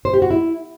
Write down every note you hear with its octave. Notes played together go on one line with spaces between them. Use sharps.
C5
G4
F#4
E4